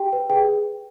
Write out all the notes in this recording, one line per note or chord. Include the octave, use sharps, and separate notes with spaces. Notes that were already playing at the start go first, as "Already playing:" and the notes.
Already playing: G4 G5
B4
G#4 G5